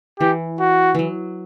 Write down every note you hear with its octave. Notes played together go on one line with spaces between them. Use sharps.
E3 G4
F#4
E3 F#3